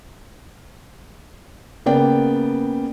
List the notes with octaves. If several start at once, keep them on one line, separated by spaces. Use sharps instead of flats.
C#3 A#3 B3 D5 G5